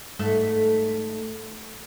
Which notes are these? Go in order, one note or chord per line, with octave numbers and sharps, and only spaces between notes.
G#2 A3 A4